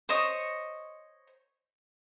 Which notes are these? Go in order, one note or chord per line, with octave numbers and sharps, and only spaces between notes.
C5 C#5 D#5 C#6